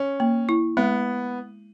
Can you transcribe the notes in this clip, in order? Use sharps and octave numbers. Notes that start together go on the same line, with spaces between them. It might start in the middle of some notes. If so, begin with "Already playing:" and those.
Already playing: C#4
A#3
E4
G#3 B3